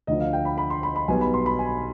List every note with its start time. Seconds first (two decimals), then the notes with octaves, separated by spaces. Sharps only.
0.07 D2 D3 F3 D#5
0.20 F5
0.33 G5
0.45 B5
0.58 B5
0.70 C6
0.83 B5
0.96 B5
1.08 B1 B2 G3 B3 G#5
1.21 B5
1.34 C6
1.46 B5
1.59 G#5